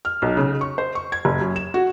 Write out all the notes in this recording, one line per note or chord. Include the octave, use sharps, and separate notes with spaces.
F6
B1
C#3
C#6
C5
C#6
G#6
F#1
F#2
E7
F#4